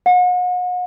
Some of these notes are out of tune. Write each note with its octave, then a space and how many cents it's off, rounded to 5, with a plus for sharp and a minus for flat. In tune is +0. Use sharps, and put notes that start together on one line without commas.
F#5 -40